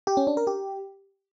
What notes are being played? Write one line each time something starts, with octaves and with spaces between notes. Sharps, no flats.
G4
C#4
D4
A#4
G4